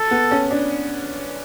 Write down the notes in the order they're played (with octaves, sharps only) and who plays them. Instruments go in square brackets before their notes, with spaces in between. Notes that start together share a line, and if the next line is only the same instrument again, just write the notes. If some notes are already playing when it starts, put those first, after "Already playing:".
Already playing: [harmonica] A4
[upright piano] B3
C#4
D4